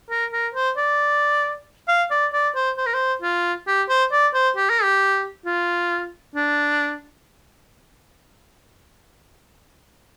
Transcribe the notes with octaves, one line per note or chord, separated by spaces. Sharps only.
A#4
A#4
C5
D5
F5
D5
D5
C5
C5
A#4
C5
F4
G4
C5
D5
C5
G4
A#4
G4
F4
D4